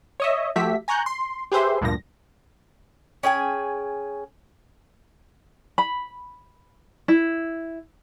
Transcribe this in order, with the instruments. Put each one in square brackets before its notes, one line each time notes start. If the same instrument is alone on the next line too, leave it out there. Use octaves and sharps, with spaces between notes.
[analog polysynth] C#5 D#5 E5
F3 A3 F#4 G4 E5 B6
G#5 A#5 C#6 F#6 G6
C6
G4 G#4 B4 C5 E5 C6
D2 G2 A#2 F3 A#6
[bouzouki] C#4 G#4 G5 G#5
[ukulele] B5
E4